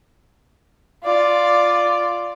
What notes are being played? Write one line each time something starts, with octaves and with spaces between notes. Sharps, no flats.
F4 D5